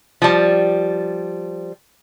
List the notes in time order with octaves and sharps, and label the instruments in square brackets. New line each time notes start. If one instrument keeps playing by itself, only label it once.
[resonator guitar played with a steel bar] F3 G3